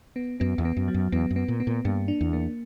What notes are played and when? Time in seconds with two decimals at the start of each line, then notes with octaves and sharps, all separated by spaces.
0.16 B3
0.40 F#2 B3
0.58 E2
0.65 B3
0.77 F#2
0.88 F#3
0.94 F#2
1.12 E2 B3
1.31 F#2
1.36 B3
1.48 A#2
1.60 B3
1.67 A#2
1.85 G2 A#3
2.08 D4
2.21 E2
2.33 A#3